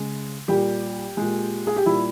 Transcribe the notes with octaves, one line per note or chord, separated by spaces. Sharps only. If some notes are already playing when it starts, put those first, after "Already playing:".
Already playing: C#3 G#3
A#2 G3 G4
A#2 G#3
G#4
G4
A#2 G3 E4